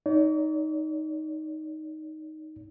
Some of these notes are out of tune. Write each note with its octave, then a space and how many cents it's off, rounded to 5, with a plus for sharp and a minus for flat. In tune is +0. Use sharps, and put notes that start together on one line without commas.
D#4 +0 D5 -45